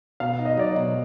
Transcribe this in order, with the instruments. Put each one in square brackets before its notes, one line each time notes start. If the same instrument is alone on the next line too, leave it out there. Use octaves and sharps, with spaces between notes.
[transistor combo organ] B2 [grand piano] F5
[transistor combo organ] D#4
[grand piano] D#5
[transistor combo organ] F#3 [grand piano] D5
[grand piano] D#5
[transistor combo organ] B2